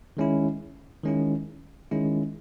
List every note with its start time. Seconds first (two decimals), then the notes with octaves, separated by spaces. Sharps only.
0.17 D#3 G#3 C#4 E4
1.04 D#3 G#3 C#4 E4
1.91 D#3 G#3 C#4 E4